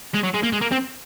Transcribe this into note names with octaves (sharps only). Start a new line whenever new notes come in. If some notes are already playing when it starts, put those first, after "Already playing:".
G#3
F#3
G#3
A#3
G#3
A#3
C4